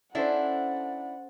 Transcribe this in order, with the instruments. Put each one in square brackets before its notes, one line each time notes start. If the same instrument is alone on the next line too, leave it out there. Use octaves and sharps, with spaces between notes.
[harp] C#4 A4 C5 [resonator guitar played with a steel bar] D4 E4 [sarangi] F#5